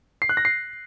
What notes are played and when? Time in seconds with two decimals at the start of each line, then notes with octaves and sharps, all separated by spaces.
0.22 C7
0.29 F#6
0.37 A#6
0.45 C7